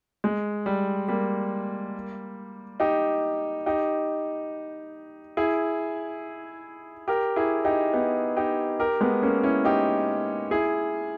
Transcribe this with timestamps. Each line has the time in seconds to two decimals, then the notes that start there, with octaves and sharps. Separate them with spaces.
0.24 G#3
0.66 G3
1.08 G3 A#3
2.80 D#4 G4
3.66 D#4 G4
5.37 E4 G#4
7.08 G4 A#4
7.36 E4 G#4
7.65 D#4 G4
7.93 B3 D#4
8.37 D#4 G4
8.80 G4 A#4
9.01 G#3 B3
9.22 A#3 C#4
9.43 C#4 E4
9.64 D#4 G4
10.51 E4 G#4